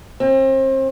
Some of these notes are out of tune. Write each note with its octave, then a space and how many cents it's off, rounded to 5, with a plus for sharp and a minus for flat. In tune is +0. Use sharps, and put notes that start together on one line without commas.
C4 +35